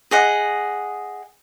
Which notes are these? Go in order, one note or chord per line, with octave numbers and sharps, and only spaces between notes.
G#4 D#5 F#5